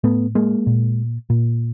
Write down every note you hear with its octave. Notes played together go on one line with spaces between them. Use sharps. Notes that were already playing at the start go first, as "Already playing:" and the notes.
A2 A3 B3
G#3 A#3
A#2
A#2